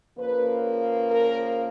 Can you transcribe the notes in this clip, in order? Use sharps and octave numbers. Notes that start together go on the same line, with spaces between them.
C#3 F3 A#3 B4
A#4